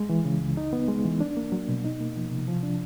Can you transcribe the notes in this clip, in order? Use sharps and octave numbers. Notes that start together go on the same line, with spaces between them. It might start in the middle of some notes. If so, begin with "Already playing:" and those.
Already playing: G#3
E3
C#3
C#2
D#4
B3
G#3
E3
D4
A#3
F#3
B2
D#4
A#3
F3
C3
F3
D4